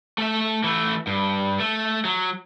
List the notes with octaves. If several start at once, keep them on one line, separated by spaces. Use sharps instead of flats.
A3 E5
E3 A3
G2
A3
F#3